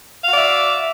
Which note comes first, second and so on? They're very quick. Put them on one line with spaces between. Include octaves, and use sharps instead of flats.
F5 F#4 D5 E5